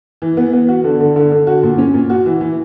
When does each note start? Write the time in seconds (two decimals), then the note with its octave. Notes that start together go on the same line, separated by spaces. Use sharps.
0.22 E3
0.37 B3
0.53 B3
0.68 F#4
0.84 D3
1.00 D3
1.16 D3
1.32 D3
1.47 F#4
1.63 A#2
1.78 C#4
1.94 A#2
2.10 F#4
2.26 E3
2.41 E3